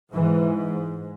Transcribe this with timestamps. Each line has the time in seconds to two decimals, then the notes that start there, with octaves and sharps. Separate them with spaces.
0.14 G#2 E3